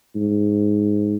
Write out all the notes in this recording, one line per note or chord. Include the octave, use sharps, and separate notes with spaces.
G#2